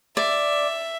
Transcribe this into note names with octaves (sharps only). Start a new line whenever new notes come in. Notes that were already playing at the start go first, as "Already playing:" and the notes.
D5 E5